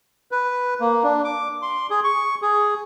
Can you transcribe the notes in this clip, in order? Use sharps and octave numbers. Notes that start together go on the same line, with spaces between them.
B4
A#3
D4
D6
C6
G#4
C#6
G#4